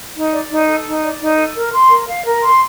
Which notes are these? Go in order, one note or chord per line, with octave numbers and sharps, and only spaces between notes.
D#4
D5
D#4
A4
D#4
D5
D#4
A4
A#4
C6
A#4
F5
A#4
C6